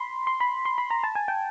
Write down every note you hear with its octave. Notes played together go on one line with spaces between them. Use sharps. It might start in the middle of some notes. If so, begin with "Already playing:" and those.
Already playing: B5 C6
C6
B5
C6
B5
A#5
A5
G#5
G5